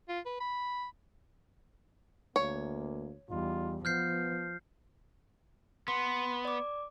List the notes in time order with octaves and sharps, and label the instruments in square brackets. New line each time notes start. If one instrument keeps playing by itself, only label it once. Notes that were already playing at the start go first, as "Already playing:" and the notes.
[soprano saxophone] F4
B4
B5
[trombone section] D2 A#3 [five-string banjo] C#5
[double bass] E2 [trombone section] G3 D#4 F4
[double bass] F3 [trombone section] B3 [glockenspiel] F6 G6 C7
[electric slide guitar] B3 [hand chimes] C6
[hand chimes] D5 D6